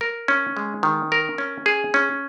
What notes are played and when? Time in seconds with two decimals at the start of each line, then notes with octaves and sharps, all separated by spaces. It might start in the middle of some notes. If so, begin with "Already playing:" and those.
0.01 A#4
0.28 C#4
0.57 G#3
0.83 D#3
1.12 A#4
1.38 C#4
1.66 G#4
1.94 C#4